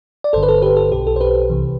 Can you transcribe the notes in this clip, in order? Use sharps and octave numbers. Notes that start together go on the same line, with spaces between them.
D5
G1 G2 D3 A4 C5
B4
A4
G4 B4
A4
B1 B2 G4
A4
C5
G4 B4
C2 C3 E3